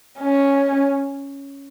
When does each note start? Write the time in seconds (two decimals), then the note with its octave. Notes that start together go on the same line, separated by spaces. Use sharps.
0.20 C#4